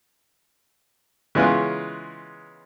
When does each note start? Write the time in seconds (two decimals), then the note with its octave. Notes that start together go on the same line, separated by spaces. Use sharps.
1.35 C#3 E3 G#3 B3 C#4 F4